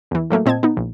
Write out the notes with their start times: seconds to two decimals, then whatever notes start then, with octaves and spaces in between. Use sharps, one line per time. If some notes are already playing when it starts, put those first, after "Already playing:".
0.11 E2 E3
0.30 A2 F#3 A3 A#3
0.46 A#2 C4 D#5 A5 G#6
0.63 B3 D#4
0.77 A#1